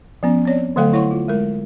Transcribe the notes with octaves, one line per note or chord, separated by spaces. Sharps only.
F3 B3 C#4
C4 C#5 D5
D3 F#3 A3 A4 F5 G5
E4 C#5 F#5 C6 C#6
F4
G#3 A#4